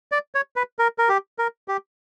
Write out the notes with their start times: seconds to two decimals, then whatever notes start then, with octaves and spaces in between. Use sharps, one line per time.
0.12 D5
0.35 C#5
0.56 B4
0.79 A#4
0.98 A#4
1.09 G4
1.39 A#4
1.68 G4